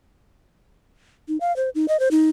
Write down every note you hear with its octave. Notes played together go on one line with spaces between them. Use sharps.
D#4
F5
C5
D#4
D#5
C5
D#4